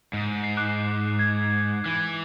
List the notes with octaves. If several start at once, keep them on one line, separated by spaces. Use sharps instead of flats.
G#2
C7
D6 F#6
G#6
E3